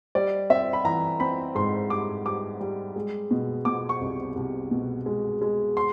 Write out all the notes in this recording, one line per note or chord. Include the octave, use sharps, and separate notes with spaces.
G3 D5
C4 E5
B5
E3 A#5
C4 B5
G#2 C6
G3 D6
G3 D6
G3
G#3
B2
B2 D6
C#6
C2
C2
B2
G#3
G#3
C6